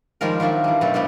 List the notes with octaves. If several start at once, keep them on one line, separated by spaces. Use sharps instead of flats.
D#3 F3 G3 G#3 F4 A#4
D#3 F#3 D4 F4 E5
E3 G3
F#2 B2 A3 G4 A4
G2 C3 G3 A3 B3 G4